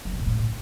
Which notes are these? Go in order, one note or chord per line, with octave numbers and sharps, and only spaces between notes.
F#3
A#2
B2
A2